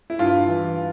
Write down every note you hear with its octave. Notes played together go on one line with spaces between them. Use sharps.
E4
G2 F4
E3